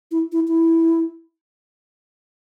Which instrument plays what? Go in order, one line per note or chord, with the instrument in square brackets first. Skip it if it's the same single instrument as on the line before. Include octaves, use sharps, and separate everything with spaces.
[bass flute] E4
E4
E4